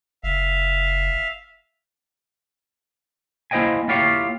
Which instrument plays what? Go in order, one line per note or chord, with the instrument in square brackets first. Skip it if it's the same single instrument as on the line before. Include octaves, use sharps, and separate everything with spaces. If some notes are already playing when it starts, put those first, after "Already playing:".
[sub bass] F#1 [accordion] E5 F5
[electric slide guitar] A#3 E4 C5 D#5 G5 G#5
A#3 E4 F4 G4 C#5 F5